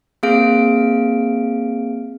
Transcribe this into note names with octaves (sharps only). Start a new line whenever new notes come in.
A#3 C4 G#4 F5 D7